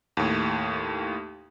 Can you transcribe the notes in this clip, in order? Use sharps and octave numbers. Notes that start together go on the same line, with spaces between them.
D#2 A2